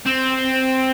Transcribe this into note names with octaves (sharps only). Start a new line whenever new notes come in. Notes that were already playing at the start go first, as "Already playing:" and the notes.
C4